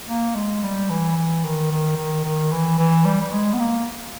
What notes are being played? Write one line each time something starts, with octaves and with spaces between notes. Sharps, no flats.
A#3
G#3
G3
E3
E3
D#3
D#3
D#3
D#3
E3
E3
G3
G3
G#3
B3
A#3